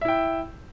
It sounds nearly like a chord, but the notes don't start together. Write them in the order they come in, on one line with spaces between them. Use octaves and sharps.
E5 E4 G5